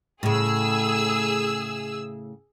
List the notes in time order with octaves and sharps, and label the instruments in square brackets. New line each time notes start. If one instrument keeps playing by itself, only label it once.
[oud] A2 C#3 [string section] G#4 E6